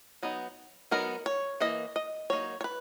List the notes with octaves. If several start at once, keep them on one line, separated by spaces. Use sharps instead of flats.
F#3 B3 D#4
F#3 B3 D#4 A#4
C#5
E3 A#3 D#5
D#5
F#3 A#3 D#4 C#5
C#5
B4